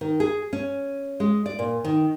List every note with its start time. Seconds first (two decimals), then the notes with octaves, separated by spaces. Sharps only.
0.01 D#3
0.20 G#4
0.53 C#4
1.20 G#3
1.46 D5
1.59 A#2
1.85 D#3